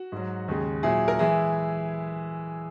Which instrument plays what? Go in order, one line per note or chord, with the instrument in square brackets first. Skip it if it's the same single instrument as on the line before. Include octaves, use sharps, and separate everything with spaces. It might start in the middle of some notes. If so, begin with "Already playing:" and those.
Already playing: [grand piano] F#4
G#2 F#3
D#2 C#3 G#3
A#2 F#3 E4 G#4
A#4
E3 G#3 E4 G#4